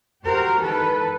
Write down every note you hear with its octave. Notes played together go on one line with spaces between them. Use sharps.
F#4 G4 A#4 C5
D#3 E3 A4 B4